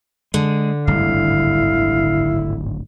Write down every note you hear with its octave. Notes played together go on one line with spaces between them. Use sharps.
D3 G#3
D1 G#1 G2 E4 F5